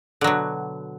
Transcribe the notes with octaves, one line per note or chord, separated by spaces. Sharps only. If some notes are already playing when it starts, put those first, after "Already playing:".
B2 D3 F#3